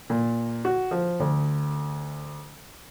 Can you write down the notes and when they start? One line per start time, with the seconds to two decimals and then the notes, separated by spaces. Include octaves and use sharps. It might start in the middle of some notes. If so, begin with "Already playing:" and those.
0.10 A#2
0.65 F#4
0.91 F3
1.20 D2